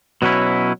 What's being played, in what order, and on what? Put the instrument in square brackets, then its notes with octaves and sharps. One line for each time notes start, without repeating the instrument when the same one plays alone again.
[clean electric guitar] B2 F#3 C#4 E4